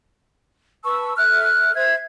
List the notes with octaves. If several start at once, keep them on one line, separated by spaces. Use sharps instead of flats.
B4 A5 C#6 E6
A4 E5 F6 F#6
C5 E5 G#6